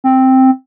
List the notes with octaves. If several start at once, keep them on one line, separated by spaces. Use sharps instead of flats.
C4